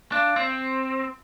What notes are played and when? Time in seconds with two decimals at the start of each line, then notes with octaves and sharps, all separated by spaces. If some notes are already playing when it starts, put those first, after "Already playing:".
0.12 D4 F5
0.36 C4